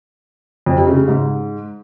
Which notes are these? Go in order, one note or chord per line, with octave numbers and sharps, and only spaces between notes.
F2
C3
C#3
C#3
G#2